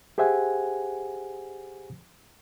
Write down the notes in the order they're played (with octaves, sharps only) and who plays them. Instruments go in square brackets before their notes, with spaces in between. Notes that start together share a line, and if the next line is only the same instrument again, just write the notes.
[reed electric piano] G4 G#4 C5 E5 F#5 G#5